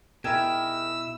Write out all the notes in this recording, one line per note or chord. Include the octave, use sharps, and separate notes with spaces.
B2 D#4 E4 G4 G#4 A#4 E6